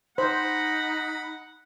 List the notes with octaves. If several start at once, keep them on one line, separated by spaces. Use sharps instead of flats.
D#4 C5 F#5 B5